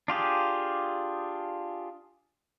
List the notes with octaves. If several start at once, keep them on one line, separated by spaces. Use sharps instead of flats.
D4 F4 G4 G#4